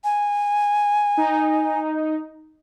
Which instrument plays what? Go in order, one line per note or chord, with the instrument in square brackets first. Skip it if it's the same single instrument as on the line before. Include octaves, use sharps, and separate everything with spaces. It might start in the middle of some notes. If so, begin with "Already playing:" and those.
[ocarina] G#5
[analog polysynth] D#4